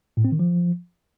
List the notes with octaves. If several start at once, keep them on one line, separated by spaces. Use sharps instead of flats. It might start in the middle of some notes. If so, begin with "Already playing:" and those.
A2
C4
D#3
F3